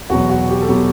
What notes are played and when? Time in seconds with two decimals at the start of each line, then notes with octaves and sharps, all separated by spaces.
0.10 E2 B2 F#3 B3 F#4
0.30 F#4
0.49 G4
0.62 A4
0.68 B2 F#3 B3 G4